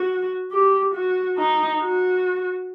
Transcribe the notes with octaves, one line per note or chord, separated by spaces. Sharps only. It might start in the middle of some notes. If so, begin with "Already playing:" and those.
Already playing: F#4
G4
F#4
D#4
F#4